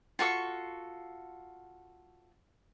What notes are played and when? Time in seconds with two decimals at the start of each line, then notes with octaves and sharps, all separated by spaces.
0.19 F4 F#4 A4 C#6